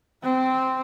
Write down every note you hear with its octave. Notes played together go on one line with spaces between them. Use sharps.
C4